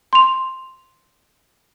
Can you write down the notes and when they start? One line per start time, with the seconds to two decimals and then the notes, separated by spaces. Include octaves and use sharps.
0.13 C6 F7